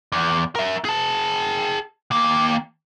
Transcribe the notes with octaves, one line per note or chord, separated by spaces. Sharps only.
E2
A#4 E5
G#4 A5
D#2 A#3